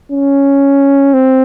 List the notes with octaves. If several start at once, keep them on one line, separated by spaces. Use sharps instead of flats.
C#4
C4